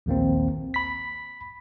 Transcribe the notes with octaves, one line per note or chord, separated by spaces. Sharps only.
A#1 D#2 A#3 C4
B5 B6